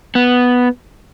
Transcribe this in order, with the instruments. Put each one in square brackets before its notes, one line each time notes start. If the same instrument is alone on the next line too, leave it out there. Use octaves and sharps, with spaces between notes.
[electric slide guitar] B3